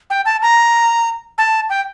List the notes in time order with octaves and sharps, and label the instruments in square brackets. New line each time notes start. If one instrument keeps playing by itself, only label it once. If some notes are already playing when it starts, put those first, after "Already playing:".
[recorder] G5
A5
A#5
A5
G5